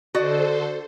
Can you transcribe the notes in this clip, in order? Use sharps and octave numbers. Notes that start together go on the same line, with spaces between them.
D3 F#4 A4 C5 D5 D#5